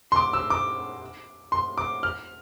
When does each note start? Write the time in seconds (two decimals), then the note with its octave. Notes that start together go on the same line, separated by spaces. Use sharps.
0.12 C6
0.16 D6
0.33 E6
0.50 D6
1.52 C6
1.78 D6
2.03 F6